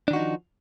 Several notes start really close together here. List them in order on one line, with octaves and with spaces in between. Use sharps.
D4 D#3 F#4 D#4 F3